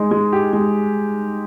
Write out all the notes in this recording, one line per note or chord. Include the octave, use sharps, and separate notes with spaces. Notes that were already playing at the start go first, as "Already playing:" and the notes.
Already playing: G#3 D#4
G#3
G4
G#3